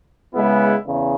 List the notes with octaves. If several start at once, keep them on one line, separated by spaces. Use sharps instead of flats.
C#3 G#3 B3 E4
E2 C#3